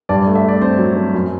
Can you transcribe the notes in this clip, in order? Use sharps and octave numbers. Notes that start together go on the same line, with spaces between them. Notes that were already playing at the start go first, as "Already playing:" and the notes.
G2 D5
A3
E5
A3 D5
C4 C5
F#3
C4
F#2